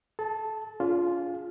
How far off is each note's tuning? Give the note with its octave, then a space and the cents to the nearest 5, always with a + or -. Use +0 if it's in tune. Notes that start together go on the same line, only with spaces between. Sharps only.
A4 -40 A5 +0
D4 -45 F4 +0 G#4 +0